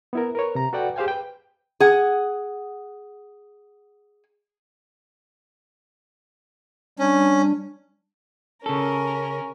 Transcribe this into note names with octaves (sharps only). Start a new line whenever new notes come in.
B3 E4 A#4
A#4 B4 C#5
C3 A#5
F#4 A4 B4 D5 F#5 G5
G4 G#4 C5 F5 G5 G#5
B4 G5
G#4 F#5
G3 C#4 D4
C#3 C#4 A4 A#4